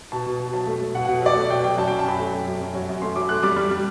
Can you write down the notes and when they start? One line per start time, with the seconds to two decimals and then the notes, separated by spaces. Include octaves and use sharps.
0.12 B2 A5
0.26 B2
0.40 B2
0.53 F#3 A5
0.67 A3
0.81 A3
0.95 B2 F#5
1.05 B2 F#5
1.22 F#3 D5
1.36 A3
1.50 B2 G5
1.64 F#3 G5
1.77 F#2 A5
1.88 F#2 G5
1.99 A5
2.06 F#3 B5
2.19 A3
2.34 A3
2.47 F#2
2.61 F#2
2.75 F#3
2.89 F#2
3.02 A3 C6
3.16 F#3 D6
3.29 A3 F#6
3.43 G3 D6
3.57 G3
3.71 G3